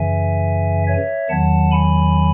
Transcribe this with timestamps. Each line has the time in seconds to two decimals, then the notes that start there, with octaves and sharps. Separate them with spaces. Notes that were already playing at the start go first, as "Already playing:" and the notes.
Already playing: F#2 C#3 E3 E5 G#5
0.88 C#5 E5
1.30 E2 D#3 F#3 F#5 A5
1.72 G#5 B5